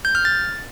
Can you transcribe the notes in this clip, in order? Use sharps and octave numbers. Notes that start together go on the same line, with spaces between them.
G6
F6
A6